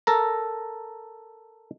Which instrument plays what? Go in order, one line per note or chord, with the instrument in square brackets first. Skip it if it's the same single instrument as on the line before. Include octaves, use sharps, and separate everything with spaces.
[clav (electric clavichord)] A4 A#4 A#5